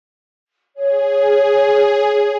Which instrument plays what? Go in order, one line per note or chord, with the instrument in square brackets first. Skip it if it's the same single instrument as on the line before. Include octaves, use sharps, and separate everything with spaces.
[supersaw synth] G#4 [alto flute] C#5